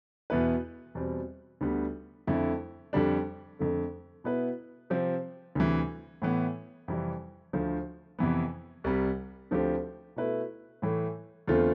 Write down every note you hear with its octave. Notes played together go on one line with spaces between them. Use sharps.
E2 B2 B3 E4 B4
E2 B2 G3 C4
D2 D3 G3 B3
F2 D3 A3 E4
F2 D3 G3 D4
F2 D3 A3
B2 B3 E4 B4
C3 F3 C4 G4
D2 C3 E3
A2 E3 B3
F2 C3 E3 G3
D2 D3 F3 A3
F2 C3 E3 B3
C2 C3 G3
D2 D3 F3 C4 G4
B2 A3 E4 B4
A2 E3 A3
E2 D3 A3 C4 F4